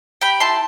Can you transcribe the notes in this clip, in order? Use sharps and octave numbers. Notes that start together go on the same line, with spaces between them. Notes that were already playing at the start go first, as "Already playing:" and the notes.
G4 G5 B5
E4 A5 C6